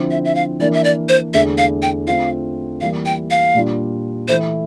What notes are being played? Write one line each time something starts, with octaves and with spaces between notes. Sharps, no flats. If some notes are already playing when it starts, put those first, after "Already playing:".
Already playing: D3 F3 C4 E4
E5
E5
F5
E3 A#3 D4 D5
E5
D5
C5
E2 D3 A3 E4 E5
F5
G5
D3 A3 C4 F4 F5
E3 G3 A#3 E4 F5
G5
F5
A#2 G3 D4 F4
E3 A3 E4 C5